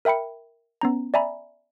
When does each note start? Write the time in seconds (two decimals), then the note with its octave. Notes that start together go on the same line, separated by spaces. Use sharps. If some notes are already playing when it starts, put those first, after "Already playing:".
0.05 A#4 E5 G5 B5 C#7
0.81 B3 C#4 A#5
1.14 D5 E5 G#5 A#5 B5